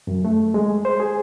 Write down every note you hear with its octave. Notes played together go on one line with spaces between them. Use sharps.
F#2
A3
G#3
C5
G#4